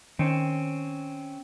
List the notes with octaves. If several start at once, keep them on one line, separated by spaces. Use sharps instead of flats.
D#3 C4 C#4